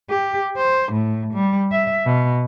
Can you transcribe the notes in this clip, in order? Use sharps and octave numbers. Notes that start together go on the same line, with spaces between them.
G4
C5
A2
G3
E5
B2